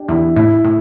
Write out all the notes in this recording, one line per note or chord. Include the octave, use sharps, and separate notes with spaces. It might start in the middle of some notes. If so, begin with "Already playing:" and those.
Already playing: D4 G4
E2 E4
A2 E4
A2